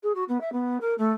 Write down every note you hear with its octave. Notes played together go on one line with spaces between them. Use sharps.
G#4
F#4
B3
E5
B3
A#4
A3